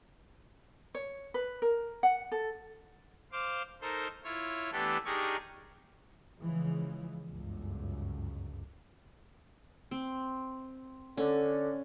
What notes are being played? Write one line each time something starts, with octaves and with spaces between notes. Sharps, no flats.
C#5
B4
A#4
F#5
A4
C5 F5 C6 D6
D#4 A4 A#4 C5 C6
E4 F4 C#5
E3 A3 B3 D4 G4 A4
D4 D#4 G4 G#4 A#4 C#6
C#3 E3 F3 G#3
G1 C#2 F#2
C4
D3 C#4